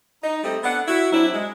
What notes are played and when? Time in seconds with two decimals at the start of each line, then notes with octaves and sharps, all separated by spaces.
0.23 D#4
0.44 G3 A3 C4 C5 D#5
0.64 B3 D4 A4 F#5
0.88 E4 F#4
1.12 F#3 C4 D4 E4
1.33 G#3